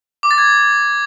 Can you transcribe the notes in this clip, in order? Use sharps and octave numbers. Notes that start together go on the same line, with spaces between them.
D6
A6
G#6